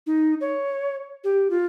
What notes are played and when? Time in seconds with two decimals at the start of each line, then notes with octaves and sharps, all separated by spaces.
0.07 D#4
0.41 C#5
1.24 G4
1.50 F4